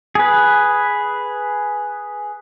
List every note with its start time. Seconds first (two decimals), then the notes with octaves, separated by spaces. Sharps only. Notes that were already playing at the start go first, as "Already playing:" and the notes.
0.15 G#4 B4